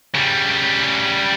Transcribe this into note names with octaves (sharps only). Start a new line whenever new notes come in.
C#3 G3